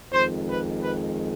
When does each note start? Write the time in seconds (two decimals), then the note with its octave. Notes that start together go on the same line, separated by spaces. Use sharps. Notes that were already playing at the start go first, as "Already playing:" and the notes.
0.12 F2 D#3 G#3 C5
0.47 B4
0.81 B4